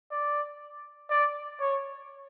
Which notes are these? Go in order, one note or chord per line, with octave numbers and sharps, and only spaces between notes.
D5
D5
C#5